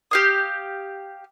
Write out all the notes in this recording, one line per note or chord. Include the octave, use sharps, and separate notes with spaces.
G4 F5 D#6